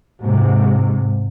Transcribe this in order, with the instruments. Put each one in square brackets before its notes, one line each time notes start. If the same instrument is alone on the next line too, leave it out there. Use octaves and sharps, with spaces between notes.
[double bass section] G#2 C3